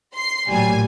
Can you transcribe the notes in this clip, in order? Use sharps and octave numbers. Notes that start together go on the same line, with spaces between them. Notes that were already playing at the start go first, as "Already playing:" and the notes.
C6 C7
A1 A#2 F#3 G3 G#5